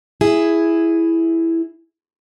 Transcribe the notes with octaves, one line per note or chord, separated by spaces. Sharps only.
E4 G#4